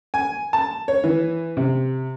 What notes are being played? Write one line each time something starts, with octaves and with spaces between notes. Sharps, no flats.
G#5
A5
C#5
E3
C3